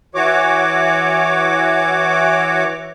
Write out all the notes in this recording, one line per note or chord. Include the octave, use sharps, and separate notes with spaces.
E3 F#4 C#5 D6